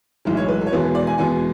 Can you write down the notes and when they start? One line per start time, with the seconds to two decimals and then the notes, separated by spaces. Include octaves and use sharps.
0.25 B1 A2 E3 G#3
0.37 C#5
0.48 B4
0.61 A4
0.66 C#5
0.72 E2 B2 G#3 B3 B4
0.95 D5
1.07 G#5
1.18 E2 B2 G#3 B3 G#5